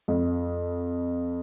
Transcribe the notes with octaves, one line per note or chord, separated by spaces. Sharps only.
F2